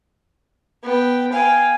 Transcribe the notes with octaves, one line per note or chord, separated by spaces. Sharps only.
B3 G5
F5 G5 G#5